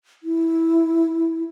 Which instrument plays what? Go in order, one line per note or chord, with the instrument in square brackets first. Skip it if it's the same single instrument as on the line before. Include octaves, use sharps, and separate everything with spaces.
[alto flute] E4